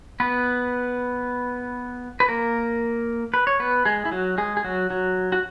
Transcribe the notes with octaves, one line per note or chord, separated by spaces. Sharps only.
B3 B4
B4
A#3 A#4
B4
C#5
B3 B4
G#3 G#4
E4
F#3 F#4
G#3 G#4
G#4
F#3 F#4
F#3 F#4
F#4